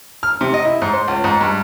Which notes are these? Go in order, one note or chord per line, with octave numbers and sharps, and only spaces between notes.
F6
C3
D#5
E4
G#2
C5
C#2
G#2
G2